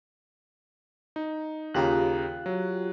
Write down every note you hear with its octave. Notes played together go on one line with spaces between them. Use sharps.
D#4
D#2 C#3 F4 G4 A#5 F#6
F#3